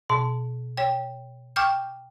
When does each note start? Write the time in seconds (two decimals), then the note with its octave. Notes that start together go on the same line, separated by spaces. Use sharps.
0.09 B2 A5
0.77 C#5 G5
1.56 G5 C#6 D6 F6 G6